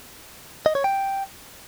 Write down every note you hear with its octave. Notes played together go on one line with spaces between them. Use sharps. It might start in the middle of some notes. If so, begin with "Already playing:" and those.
D#5
C#5
G5